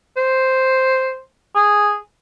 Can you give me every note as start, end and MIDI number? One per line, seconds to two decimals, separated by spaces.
0.17 1.20 72
1.56 1.96 68